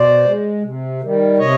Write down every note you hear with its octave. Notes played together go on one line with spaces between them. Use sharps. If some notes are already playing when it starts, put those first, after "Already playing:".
Already playing: B2 C5 D5
G#3
C3
D#3 G3
C3 C#5 D#5